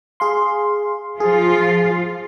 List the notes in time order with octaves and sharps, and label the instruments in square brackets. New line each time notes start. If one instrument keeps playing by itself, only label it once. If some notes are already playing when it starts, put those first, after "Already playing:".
[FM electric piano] G#4 F5 C6
[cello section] F3 F4 [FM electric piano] G#4